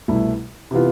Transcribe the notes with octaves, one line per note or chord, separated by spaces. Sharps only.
C2 B2 A3 E4
C3 E3 B3 F4